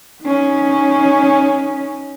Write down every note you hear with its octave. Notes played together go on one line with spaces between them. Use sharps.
C#4 D#4